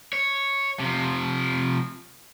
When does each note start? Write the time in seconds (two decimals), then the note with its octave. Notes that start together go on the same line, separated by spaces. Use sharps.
0.13 C#5
0.80 C3 F3